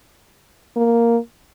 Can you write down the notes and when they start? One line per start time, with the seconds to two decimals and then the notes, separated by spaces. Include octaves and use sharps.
0.77 A#3